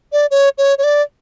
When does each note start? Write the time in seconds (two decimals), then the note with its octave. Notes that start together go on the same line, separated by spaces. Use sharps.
0.12 D5
0.31 C#5
0.58 C#5
0.78 C#5
0.84 D5